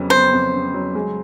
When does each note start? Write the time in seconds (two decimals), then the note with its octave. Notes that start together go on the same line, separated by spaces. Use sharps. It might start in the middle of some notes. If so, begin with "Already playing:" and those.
Already playing: F2 C#3 F#3 B3
0.10 B3 C5
0.32 F2
0.53 C#3
0.74 F#3
0.95 G#3